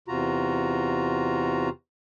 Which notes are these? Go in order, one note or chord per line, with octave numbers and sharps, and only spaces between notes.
E2 C3 F4 F#4 A#5